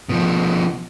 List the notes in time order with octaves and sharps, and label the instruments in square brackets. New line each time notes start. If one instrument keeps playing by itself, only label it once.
[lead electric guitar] B2 F3